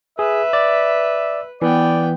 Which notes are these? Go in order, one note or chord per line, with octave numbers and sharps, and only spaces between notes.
G#4 B4 E5
D5
E3 B3 D5 G5